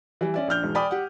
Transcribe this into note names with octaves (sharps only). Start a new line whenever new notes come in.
E3 G3
C#4 D5 E5
A#1 D4 F6 G6
E1 G#2
D5 G5 G#5 B5 D6 D#6
G4 F#5